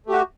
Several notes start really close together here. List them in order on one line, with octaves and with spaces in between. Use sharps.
A3 G4 F#4